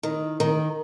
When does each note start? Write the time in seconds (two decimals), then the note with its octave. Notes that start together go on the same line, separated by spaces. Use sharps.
0.03 D#3
0.40 D#3